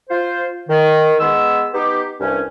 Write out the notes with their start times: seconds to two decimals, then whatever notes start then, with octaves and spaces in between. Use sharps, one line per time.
0.10 F4 C5
0.70 D#3
1.20 G#3 B3 E6
1.74 B3 D#4 G4
2.21 C2 G2 C#4